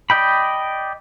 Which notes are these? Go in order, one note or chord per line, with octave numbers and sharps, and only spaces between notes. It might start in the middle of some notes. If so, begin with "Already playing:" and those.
D5 D#5 G5 B5